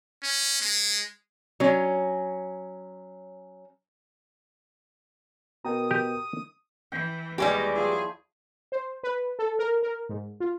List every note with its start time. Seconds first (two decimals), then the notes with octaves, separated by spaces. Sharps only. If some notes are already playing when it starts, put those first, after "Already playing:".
0.23 C#4
0.62 G#3
1.60 F#3 C#4
5.65 B2 A#4 G5 A#5 D#6
5.91 G4
6.92 E3 G5
7.38 D#2 E3 G3 G#3 D#4 G4 C#5 D5
7.76 F3 E4 G#4
8.72 C5
9.03 B4
9.39 A4
9.59 A#4
9.83 A#4
10.09 G#2
10.40 F4